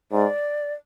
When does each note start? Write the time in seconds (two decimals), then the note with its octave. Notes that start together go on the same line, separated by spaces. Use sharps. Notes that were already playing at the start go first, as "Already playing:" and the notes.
0.12 G#2 D5